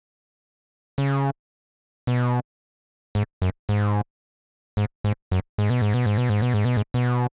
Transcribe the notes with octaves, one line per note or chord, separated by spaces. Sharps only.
C#3
B2
G#2
F#2
G#2
G#2
G#2
F#2
G#2
B2
G#2
B2
G#2
B2
G#2
B2
G#2
B2
G#2
B2